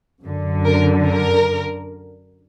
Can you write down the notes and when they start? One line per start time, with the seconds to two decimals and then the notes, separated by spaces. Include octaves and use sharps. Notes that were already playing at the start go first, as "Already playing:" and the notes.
0.24 F#2 D3
0.65 A#4
1.08 A#4